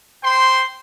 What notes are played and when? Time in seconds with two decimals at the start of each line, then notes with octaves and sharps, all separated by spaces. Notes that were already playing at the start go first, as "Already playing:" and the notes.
0.23 C5 G5 C6